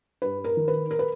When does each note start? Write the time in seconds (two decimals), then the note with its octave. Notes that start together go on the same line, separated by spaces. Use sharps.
0.22 G2 B4
0.44 A#4
0.57 D#3
0.68 B4
0.91 A#4
0.99 B4